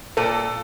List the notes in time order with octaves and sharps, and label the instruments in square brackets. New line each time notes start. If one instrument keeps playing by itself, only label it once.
[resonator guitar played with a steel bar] A#2 [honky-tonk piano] A4